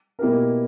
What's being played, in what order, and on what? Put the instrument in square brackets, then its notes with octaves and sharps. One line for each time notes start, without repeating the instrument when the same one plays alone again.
[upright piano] B2 A#3 E4 G4 A#4